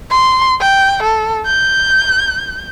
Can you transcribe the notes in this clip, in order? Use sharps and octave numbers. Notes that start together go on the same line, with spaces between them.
C6
G5
A4
G6